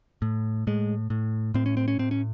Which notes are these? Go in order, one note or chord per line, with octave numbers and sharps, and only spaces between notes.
A2
A2 G#3
A2
A2 C4
C#4
C4
C#4
A2 C4
C#4